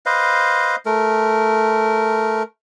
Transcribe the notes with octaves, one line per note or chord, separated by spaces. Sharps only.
B4 C5 D#5 F5
A3 A#4